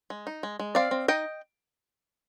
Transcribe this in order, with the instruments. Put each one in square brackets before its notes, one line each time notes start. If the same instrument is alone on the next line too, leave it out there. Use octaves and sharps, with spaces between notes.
[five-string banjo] G#3
D#4
G#3
G#3
C4 D5 F5
C4
D#4 D#5 G5